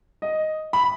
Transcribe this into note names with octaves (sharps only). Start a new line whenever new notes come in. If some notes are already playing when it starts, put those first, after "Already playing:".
D#5
B5